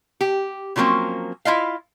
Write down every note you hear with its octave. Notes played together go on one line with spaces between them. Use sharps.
G4
C#3 F3 F#3 A#3 C4 C#4
E4 F4 D#5 F5